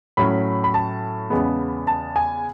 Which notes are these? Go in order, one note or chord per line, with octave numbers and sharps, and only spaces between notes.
A2 F#3 C#4 B5
B5
A5
E2 C#3 G#3 B3
A5
G#5